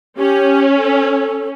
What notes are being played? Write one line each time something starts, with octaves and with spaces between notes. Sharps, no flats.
C#4 G4
A4